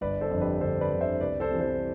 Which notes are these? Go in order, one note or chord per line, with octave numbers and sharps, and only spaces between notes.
G1 B4 D5
A4 C5
F2 D3
G4 B4
G1 A4 C5
B4 D5
F2 D3
C5 E5
C2 B4 D5
A4 C5
C3 E3
A4 C5